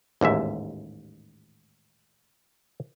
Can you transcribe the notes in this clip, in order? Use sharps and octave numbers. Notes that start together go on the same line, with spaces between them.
A1 D#2 G#2 E5